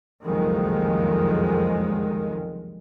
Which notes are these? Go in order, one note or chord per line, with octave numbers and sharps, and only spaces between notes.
F#1 C2 F2 D#3 G#3